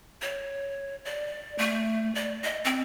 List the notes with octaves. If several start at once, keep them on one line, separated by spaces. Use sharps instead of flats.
C#5
D5
A3
D5
D#5
C4